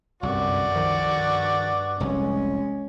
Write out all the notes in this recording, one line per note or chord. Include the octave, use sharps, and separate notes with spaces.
G1 C2 F#2 F#4 D5
C2 D#3 F3
G2
F1 C2 G#3 C#4